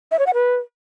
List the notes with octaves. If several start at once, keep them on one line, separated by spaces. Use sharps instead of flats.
E5
C#5
F#5
B4